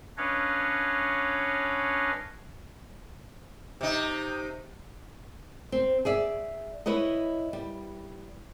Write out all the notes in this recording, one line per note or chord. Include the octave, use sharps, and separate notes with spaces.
C#4 D4 B4 C#5 D#5 F5
C3 D#4
C4
G#4 D5 E5
E4 B4 C#5 D#5
G3